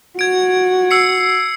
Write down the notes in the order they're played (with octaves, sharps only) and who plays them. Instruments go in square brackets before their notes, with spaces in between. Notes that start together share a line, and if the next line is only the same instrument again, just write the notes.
[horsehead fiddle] F#4 [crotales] G#6 D7
[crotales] E6 C7 C#7